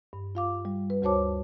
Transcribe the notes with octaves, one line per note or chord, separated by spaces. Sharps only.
G2
F4 F5 D6
G3
B4
D2 F#4 C5 C#5 A5 D6